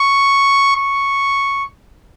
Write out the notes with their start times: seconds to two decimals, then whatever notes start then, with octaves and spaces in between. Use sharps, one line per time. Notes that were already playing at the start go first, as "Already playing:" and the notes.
Already playing: C#6
0.77 C#6